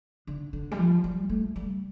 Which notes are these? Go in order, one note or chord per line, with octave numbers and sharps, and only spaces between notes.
D3
D3
G3
F3
G3
A3
G3